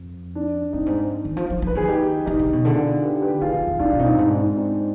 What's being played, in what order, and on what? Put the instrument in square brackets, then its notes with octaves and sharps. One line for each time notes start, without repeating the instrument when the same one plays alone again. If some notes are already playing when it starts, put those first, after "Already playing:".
Already playing: [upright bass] F2
[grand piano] D4
[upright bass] G2 [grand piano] C4 D#4
[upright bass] G#2
D#3
F3
F3
[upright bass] F3 [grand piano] B4
[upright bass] D#3 [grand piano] G#4
[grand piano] D#4 G4
[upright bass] D#3 [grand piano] D#4 G4
[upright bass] D3
B2
[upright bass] D3 [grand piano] F4 G#4
[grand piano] G4 B4
G4 B4
[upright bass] D#3 [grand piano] F4 G#4
[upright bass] D#3
F2
[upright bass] G2 [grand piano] D4 F4
[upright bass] B2
[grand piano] C4 D#4
[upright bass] G2
[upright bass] G#2 [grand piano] D4
[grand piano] D4
C4 D#4